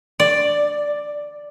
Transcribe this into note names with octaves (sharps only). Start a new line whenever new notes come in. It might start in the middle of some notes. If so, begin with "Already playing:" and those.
D5